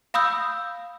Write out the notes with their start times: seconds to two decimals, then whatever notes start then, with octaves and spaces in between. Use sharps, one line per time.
0.14 F5 B5 D#6 E6 G6